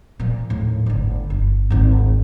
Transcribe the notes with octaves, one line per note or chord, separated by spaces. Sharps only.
A#2 F3
D#2 A2
G1 D2
G1
G#1 D2